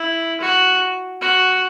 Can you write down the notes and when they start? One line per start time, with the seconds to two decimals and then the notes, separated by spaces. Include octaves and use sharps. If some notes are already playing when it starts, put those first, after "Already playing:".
Already playing: E4
0.40 F#4
1.22 F#4